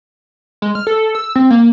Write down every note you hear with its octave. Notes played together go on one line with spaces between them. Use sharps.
G#3
F6
A4
E6
C4
A#3